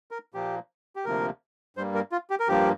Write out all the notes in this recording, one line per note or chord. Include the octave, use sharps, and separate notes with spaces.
A#4
A#2 F3 A#3 G4
G4
D2 C3 F3 A#3 A#4
G2 G3 A#3 C5
A#4
F4
G4
A#4
G2 F3 A#3 G4